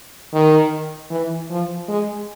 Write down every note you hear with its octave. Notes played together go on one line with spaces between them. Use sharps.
D#3
E3
F3
G#3